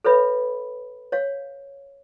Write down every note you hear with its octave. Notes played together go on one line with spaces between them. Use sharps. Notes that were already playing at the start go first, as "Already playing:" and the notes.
A4 B4 C#5 E5 B5
C#5 F5